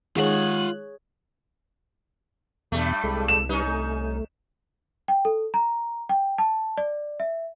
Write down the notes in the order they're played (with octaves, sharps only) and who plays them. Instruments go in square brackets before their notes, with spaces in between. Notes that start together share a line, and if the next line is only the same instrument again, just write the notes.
[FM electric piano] D#3 G#3 [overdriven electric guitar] F4 F#5 [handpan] G#4 C#5 [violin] F#6
[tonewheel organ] E2 B2 [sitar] G2 G3 A3
[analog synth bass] C2 [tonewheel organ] G#3 A4
[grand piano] E7
[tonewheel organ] G3 B4 [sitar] C#4 D#4
[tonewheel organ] A3
[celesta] G5
A4
A#5
G5
A5
D5
E5